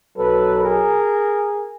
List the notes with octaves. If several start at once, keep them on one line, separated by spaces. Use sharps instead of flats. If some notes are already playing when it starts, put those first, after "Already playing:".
B1 B2 F#3 A4 B4
G#4 A#4